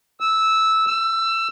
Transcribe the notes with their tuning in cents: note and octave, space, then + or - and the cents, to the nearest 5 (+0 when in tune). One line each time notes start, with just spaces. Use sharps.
E6 -10
E6 +20